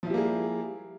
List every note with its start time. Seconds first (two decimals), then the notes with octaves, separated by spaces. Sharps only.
0.03 F3
0.07 E4
0.10 G3
0.14 A#3
0.17 G#4